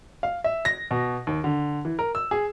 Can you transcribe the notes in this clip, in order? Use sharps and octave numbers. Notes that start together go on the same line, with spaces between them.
F5
E5
A#6
B2
D#2
D3
E3
A#4
E6
G#4